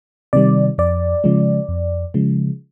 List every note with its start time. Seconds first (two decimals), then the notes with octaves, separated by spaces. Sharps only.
0.33 C3 D#3 G3 D5
0.78 F2 D5
1.24 C#3 F3 G#3
1.69 F2
2.14 C#3 F3 G#3